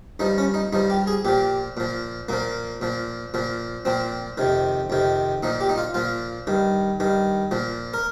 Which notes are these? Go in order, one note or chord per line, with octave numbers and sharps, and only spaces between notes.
G2 F3 D#4
C#4
D#4
G2 F3 D#4
G4
G#4
A#2 F3 G4
A#2 F3
A#2 F3 A#3
A#2 F3
A#2 F3
A#2 F3 C4
F2 C3 D#3
F2 C3 D#3
A#2 F3 D#4
G4
D#4
F4
A#2 F3 F4
G2 D#3
G2 D#3
A#2 F3
A#4